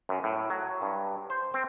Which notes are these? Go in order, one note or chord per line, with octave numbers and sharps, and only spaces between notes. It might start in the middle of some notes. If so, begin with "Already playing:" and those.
F#2
A2
F#3
G2
C5
C4